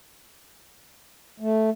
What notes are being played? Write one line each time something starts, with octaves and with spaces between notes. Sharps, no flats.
A3